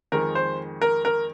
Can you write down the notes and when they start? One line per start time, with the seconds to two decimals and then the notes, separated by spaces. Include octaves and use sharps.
0.12 F2 D#3 G#3 A#4
0.35 C5
0.82 A#4
1.05 A#4